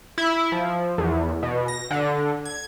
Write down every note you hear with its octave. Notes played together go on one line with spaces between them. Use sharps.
E4
F3
E2
B2
A#6
D3
G#6